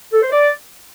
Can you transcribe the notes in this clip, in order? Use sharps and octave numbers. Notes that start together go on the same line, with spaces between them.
A4
C5
D5